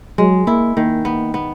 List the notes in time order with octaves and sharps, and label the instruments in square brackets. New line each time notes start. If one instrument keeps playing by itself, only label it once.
[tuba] F#3 [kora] G#3
[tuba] A#3 [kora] E4
[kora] D#3 [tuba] A#3
[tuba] A#3 [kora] B3
[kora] B3